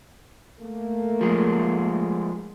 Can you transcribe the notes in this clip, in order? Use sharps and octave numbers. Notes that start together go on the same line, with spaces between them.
A3 A#3
F3 G#3